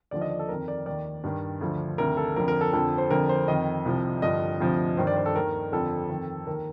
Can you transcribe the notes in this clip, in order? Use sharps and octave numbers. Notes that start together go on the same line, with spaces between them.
D#2 D3 F3 D5
D#5
D5
A4
F2 D#3 A#4
D5
D#2 D#3 D5
G2 D#3
D2 D3 F3
D2 C3 D#3 A#4
A4
F2 D3 F3 A#4
A#4
A4
F2 D3 F3 A4
C5
F2 D3 F3 A#4
C5
F2 D#3 D#5
C2 C3 F3
G2 D3 F3 D#5
D2 C3 F3
G2 D#3 C5
D5
C5
A4
D#2 D#3 A#4
F2 D3 F3 A4
F2 D#3
D#2 D#3 A#4